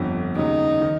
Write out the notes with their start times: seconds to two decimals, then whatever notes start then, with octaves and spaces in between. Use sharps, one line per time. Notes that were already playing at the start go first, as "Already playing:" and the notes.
Already playing: G1 F2 D3
0.36 D#2 C#3 F#3 D#4
0.81 D#3